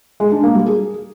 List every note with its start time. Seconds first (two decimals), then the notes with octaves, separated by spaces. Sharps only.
0.20 G#3
0.32 D4
0.43 A#3
0.55 G3
0.67 G#4